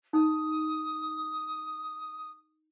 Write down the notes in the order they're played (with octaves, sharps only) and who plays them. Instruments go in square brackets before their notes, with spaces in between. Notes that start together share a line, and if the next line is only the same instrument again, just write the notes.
[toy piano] D#4 [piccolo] D#6